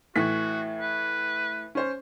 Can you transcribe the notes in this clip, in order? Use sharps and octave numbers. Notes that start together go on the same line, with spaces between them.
A2 E3 F#4 B6
B4
C#4 C5